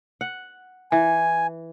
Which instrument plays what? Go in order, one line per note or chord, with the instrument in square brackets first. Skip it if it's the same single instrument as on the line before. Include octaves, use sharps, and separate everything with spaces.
[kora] F#5
[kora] E3 [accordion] G#5